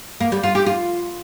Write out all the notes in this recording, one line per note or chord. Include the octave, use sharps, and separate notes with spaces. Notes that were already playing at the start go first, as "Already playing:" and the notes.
A#3
G3
F4
G4
F4